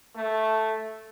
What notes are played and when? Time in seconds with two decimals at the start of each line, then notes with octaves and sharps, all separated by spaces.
0.16 A3